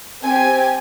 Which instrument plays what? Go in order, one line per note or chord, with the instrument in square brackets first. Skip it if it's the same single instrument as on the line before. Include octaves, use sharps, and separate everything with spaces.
[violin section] C4 G4 G#5